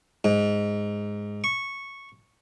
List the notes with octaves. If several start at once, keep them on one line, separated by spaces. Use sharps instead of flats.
G#2
C#6